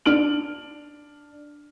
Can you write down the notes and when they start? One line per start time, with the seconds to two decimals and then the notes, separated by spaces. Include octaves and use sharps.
0.05 D4 F6 D7 F#7